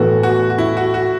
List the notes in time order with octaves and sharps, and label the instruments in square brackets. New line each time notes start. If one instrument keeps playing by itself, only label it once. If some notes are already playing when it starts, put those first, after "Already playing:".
Already playing: [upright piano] A2 E3 B3 A4 [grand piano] F#4
[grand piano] F#4
F#4
E4
F#4
F#4